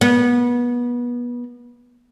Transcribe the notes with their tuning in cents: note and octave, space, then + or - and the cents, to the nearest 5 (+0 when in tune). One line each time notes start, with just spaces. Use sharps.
B3 -25